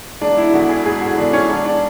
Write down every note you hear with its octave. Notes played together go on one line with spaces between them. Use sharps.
E1 D4
E4
E2 D3 F#4
G#4
E1 G#4
F#4
E2 D3 D4
C#4
E1 D4
D4